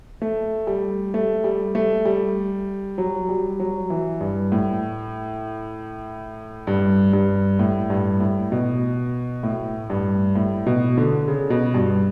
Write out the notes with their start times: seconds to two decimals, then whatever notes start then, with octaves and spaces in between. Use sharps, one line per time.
0.22 A3
0.67 G3
1.14 A3
1.44 G3
1.75 A3
2.05 G3
2.98 F#3
3.29 G3
3.60 F#3
3.90 E3
4.21 G2
4.52 A2
6.67 G2
7.13 G2
7.59 A2
7.90 G2
8.20 A2
8.52 B2
9.43 A2
9.90 G2
10.35 A2
10.66 B2
10.97 D3
11.28 C#3
11.50 B2
11.74 G2